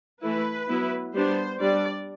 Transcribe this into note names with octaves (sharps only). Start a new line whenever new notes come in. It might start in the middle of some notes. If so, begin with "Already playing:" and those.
E3 A3 E4 B4
F#3 B3 E4
G3 B3 D4 C5
G3 D4 D5